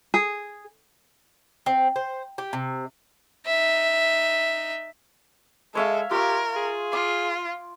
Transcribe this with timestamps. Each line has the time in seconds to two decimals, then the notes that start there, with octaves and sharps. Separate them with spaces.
0.14 G#4
1.66 C4
1.96 C5
2.38 G4
2.53 C3
3.46 D#4 E5
5.75 G#3 A4 C#5 E5 F5
6.11 F4 G4 A#4 C#6
6.56 G#4
6.93 F4 D6